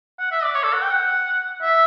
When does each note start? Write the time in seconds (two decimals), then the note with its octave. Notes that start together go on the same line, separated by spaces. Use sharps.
0.19 F#5
0.31 E5
0.43 D5
0.55 C#5
0.63 A4
0.73 F#5
0.82 G5
0.91 F#5
1.62 E5